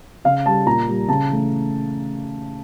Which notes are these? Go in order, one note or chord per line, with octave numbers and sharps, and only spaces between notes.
C#3 F5
G3 A5
A#2 A#5
G3
C#3 A5
E3 A3